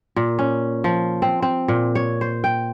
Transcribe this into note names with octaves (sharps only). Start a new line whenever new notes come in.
A#2
C#4
F3
C4
C4
A#2
C#5
C5
G5